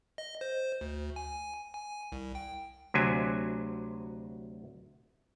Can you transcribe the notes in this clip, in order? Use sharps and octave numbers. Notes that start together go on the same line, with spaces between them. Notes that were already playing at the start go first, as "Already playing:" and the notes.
D#5
C5
D2
G#5
G#5
C2
G5
D2 C3 F#3 G#5